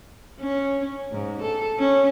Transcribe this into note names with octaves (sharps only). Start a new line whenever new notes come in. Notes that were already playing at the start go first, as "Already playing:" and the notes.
C#4
G#2
A4
C#4